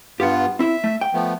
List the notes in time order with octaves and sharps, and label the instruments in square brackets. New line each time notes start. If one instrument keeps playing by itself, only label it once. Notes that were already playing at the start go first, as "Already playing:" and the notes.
[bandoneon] G2 B3 F4 [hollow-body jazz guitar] G4 F#5
[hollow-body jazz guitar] C4 E4 [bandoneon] E5
[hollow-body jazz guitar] A3
G5
[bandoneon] F3 A3 B3